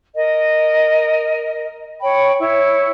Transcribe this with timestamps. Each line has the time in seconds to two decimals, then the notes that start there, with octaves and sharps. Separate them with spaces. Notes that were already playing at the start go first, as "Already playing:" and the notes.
0.16 A#4 D#5
2.01 C#5 G5 B5
2.40 E4 C#5